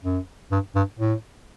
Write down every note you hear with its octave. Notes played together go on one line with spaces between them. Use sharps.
F#2
G2
G2
A2